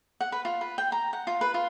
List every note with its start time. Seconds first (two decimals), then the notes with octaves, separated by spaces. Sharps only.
0.21 F#5
0.32 B4
0.45 F4
0.61 B4
0.78 G5
0.92 A#5
1.13 F#5
1.27 F4
1.41 B4
1.54 F4